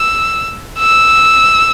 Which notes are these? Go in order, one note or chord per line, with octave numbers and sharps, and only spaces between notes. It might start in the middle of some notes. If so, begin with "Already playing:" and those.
Already playing: E6
E6